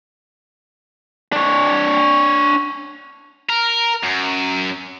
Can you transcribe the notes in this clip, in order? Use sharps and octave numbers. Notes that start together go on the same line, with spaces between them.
D4 C#5
A#4
F#2